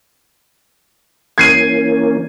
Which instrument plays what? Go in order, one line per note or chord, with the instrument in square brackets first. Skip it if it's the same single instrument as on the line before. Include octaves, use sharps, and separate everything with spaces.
[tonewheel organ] E3 A#3 C#4 [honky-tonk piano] G#6 C7 D#7